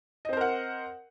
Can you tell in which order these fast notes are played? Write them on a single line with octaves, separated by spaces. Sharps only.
D#5 C4 C5 A#4 F#5